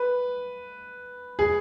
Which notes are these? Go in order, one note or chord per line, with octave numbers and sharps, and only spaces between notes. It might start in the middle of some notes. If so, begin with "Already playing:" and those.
Already playing: B4
G#4